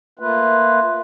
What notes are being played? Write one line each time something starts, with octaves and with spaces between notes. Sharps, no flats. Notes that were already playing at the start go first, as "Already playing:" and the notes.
A3 A#3 F4 B4